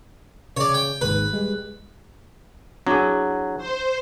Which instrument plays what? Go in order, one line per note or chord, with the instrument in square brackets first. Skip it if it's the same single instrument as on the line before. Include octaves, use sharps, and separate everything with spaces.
[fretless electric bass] C#3 [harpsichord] C#5 D5
[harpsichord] G5
[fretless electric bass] G#1 D#2 G#2 [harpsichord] B4
[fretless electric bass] G3 G#3
[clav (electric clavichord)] F#3 [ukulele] D4 E4 G#4
[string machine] C5